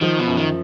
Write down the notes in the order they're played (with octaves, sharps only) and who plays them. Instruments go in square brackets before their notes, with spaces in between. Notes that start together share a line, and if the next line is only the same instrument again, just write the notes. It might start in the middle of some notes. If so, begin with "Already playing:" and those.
[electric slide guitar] D#3 [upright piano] F3
[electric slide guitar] B2
[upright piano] F#2
[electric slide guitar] D#3